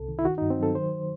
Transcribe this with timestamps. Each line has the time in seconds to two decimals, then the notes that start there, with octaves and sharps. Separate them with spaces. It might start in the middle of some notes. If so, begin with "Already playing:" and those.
Already playing: C2 C3 A4
0.09 D#3
0.19 E4
0.25 D#3 F#4
0.38 D#4
0.42 G2
0.50 C4
0.59 F#3 A4
0.75 D#3 C5